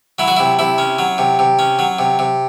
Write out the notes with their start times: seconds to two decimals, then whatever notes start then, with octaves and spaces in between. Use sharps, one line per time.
0.19 F#3 E4
0.28 F#4
0.36 C3 E4
0.59 C3 E4
0.78 C#4
0.99 F#3
1.18 C3
1.39 C3
1.59 C#4
1.79 F#3
1.99 C3
2.19 C3